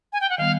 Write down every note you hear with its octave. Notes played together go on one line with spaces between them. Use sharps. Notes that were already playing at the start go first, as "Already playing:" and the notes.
G#5
G5
F#5
D#3 G3 B3 F5